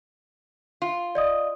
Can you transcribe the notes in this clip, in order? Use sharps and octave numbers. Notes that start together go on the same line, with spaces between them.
F4
D5 D#5 D#6